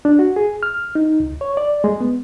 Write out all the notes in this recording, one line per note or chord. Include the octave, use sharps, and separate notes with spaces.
D4
F#4
G#4
F6
D#4
C#2
C#5
D5
G#3
B3